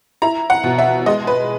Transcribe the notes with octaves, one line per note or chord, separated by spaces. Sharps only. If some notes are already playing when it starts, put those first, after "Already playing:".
E4 A#5
F#5
B2
E5
G#3 D#5
B4